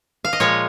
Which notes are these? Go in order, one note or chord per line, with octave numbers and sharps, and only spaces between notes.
F5
D#5
A#2 F3 G#3 C#5